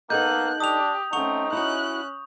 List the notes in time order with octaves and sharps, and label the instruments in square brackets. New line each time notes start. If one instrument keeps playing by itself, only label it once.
[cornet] A#3 [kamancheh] B3 F#6 [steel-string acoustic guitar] D#4 A4 D#5 [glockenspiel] G6
[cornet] D4 [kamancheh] G4 [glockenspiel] D#6 F7
[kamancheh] A3 C4 [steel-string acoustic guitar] C#4 F#5 [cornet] D#4 [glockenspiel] C#6 F7
[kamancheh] C#4 F#6 [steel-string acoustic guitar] E4 F#4